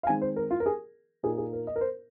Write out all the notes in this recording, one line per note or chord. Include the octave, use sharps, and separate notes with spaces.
F5
D#3 G#3 C4 D#4 G#5
C5
A#4
F4
A#4
G#4
A#2 A#3 D#4 G#4
G#4
A#4
D#5
A#4
C5